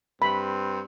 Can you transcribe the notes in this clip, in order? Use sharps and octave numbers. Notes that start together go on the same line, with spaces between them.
G2 C4 B5